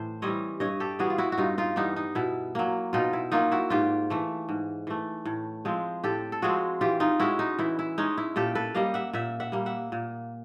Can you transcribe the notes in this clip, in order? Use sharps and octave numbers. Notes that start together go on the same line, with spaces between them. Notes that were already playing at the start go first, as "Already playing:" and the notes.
Already playing: A2 E3 C5
E3 G3 C4 C#5 D#5
G2 C#5 D#5
G4 A4
E3 G3 B3 F#4 G#4
F4
E4 F#4
F#4
G2 D#4 F4
D#4 F4
E3 G3 B3 D#4
D#4
B2 E4
F#3 A#3
B2 D#4 F4
E4
F#3 A#3 D#4 F4
E4 F#4
G#2 F4 G4
E3 A3
G#2
E3 A3
A2
F3 G#3 C4
A2 G4 A4
A4
F3 G#3 C4 F#4 G#4
E3 F4 G4
D#4 F4
G#3 C#4 E4 F#4
D#4
E3 E4
E4
G#3 C#4 D#4
E4
A#2 G4 A4
A4 B4
G3 A#3 D#5 F5
E5 F#5
A#2 E5 F#5
E5 F#5
G3 A#3
E5 F#5
A#2